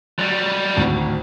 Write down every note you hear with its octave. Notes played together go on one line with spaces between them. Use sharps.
F#3 G3
G#1 D2 A2